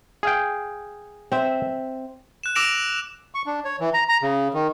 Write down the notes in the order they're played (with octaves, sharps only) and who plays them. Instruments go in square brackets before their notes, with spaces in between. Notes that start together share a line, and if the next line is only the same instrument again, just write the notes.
[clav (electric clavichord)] G#4 F5 G5
[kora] C4 E5
[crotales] F#6 E7
D6 E6 A#6 D7 E7 F7
[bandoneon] C#6
D4
C#5
E3
A#5
A#5
C#3
D#3